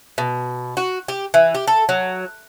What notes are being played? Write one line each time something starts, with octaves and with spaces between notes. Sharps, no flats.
B2
F#4
G4
E3
G4
A4
F#3